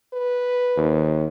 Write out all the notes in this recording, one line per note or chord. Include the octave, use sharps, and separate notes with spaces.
B4
D#2